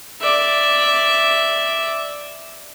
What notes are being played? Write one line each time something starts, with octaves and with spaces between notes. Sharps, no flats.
D5 E5